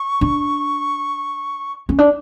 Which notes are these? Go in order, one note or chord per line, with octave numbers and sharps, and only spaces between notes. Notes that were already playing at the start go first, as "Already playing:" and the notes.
Already playing: C#6
D4
C#4
D4